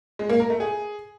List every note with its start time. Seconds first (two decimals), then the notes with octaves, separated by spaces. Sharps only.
0.19 G#3
0.29 A#3
0.40 A#4
0.50 A3
0.60 G#4